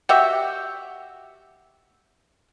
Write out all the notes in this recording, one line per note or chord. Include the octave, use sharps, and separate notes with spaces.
F#4 G4 E5